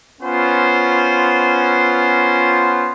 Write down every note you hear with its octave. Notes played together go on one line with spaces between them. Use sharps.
B3 C#4 F4 C5